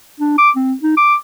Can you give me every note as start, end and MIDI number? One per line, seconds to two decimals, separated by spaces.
0.20 0.37 62
0.38 0.51 86
0.56 0.73 60
0.83 0.94 63
0.97 1.15 86